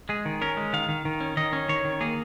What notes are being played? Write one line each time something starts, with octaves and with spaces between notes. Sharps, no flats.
G#3 G#4
D#3
C#4 A#4
G#3
D#3 F5
D#3
D#3
C#4
D#3 D#5
C#4
D#3 C#5
D#3
A#3 G#4